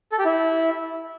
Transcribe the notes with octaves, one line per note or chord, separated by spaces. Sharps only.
A4
G4
E4